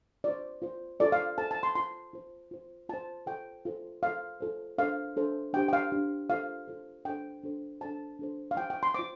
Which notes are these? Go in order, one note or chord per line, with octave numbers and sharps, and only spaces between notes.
F4 C5 D5
F4 C5
F4 A4 C5 D5
F5
F4 A4 C5 A5
A5
C6
F4 C5 C6
F4 C5
F4 C5
F4 C5 A5
F4 A4 C5 G5
F4 A4 C5
F4 A4 C5 F5
F4 A4 C5
D4 A4 C5 F5
D4 A4 C5
D4 G4 C5 G5
G5
F5
D4 G4 C5
F4 A4 C5 F5
F4 A4 C5
D4 A4 C5 G5
D4 A4 C5
D4 A4 C5 A5
D4 A4 C5
F5
F4 C5 G5
G5
C6
F4 C5 D6